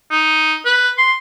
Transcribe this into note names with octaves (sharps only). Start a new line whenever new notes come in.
D#4
B4
C6